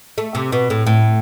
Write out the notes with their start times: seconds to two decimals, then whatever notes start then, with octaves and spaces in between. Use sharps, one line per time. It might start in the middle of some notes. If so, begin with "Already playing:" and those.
0.18 A3
0.35 C3
0.52 B2
0.70 A2
0.86 A2